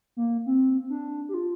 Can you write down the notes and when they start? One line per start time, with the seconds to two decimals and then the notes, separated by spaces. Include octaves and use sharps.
0.17 A#3
0.46 C4
0.90 D4
1.29 G4
1.34 F4